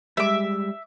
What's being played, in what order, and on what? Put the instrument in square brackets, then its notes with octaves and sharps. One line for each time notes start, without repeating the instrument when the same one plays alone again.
[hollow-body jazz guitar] G3 G#3 [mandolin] E5 D6